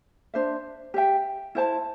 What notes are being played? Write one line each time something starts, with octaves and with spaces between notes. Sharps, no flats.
D4 C5 E5
G4 E5 G5
E4 C5 A5